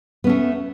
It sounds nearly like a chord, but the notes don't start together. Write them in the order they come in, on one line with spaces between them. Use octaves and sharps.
B3 C#4 A3